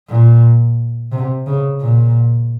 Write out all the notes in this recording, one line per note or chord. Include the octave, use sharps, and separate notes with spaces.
A#2
C3
C#3
A#2